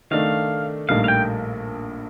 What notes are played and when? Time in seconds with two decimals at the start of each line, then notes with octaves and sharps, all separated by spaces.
0.11 D#3 A3 D4 F5
0.89 A#1 A2 G3 A#3 D#4 F5
1.04 F5
1.08 G5